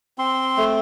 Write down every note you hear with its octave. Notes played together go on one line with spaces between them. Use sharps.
C4 C6
A3